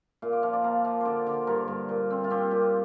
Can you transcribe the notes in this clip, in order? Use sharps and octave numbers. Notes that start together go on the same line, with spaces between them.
A#2 F5
D5
F3 F5
D5
A#3 F5
F3 F5
D3 C5 D5
D3
G2 A#4
G2
A#2
C4
F4
C4 G4
A#2